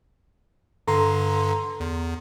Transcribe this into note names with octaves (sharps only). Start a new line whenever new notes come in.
G2 D3 A4 A#5 C6
E2